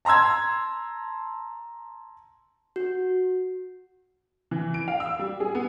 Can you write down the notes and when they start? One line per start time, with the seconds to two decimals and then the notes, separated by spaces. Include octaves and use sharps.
0.05 A5 A#5 C6 E6 G#6
2.76 F#4
4.51 E3
4.74 D7
4.88 F5
5.00 E6
5.19 G3
5.40 G#4
5.55 B3